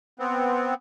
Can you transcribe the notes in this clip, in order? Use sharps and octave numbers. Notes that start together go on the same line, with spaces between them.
B3 C4